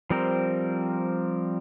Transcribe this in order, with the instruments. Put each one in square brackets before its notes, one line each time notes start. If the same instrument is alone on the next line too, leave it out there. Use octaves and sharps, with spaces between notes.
[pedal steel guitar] F3 G3 C4 A#4